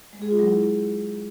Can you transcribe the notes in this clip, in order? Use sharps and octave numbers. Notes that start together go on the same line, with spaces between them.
G#3
G#4
F4
F#3
E4